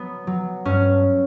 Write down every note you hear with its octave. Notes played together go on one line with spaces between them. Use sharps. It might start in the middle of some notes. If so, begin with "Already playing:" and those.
Already playing: F#3 B3
F#3
G2 C#4